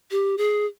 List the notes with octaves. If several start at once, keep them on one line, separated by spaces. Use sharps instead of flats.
G4
G#4